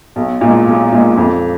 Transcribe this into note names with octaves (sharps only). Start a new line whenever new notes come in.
B1
A#2 G#3
B1
A#2 G#3
F2